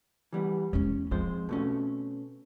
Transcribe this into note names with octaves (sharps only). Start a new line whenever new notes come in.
E3 G3 B3
E2 G#3 C#4
F3 G#3 C4 C5
B2 A3 C#4